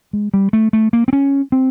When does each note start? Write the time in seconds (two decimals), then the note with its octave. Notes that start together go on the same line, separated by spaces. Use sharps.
0.13 G#3
0.34 G3
0.53 A3
0.73 A3
0.93 A#3
1.08 C4
1.13 C#4
1.52 C4